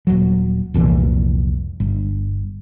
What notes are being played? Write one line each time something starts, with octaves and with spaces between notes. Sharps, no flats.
D#1 F#3
F1 C2 A#2 E3
G1